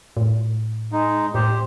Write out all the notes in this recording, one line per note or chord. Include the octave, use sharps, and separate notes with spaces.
A2
G#3 D#4
A2 G4 C5